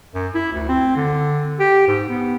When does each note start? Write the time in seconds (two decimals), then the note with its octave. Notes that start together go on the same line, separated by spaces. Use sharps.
0.14 F#2
0.34 E4
0.52 D2
0.68 C4
0.96 D3
1.59 G4
1.87 G#2
2.09 B3